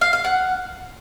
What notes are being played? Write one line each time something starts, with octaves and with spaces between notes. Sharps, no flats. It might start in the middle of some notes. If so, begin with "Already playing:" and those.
F5
F5
F#5